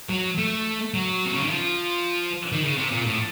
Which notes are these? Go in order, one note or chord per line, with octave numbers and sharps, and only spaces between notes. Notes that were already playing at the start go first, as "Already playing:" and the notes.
F#3
A3
F#3
C3
C#3
D#3
F3
D#3
C#3
C3
A#2
A2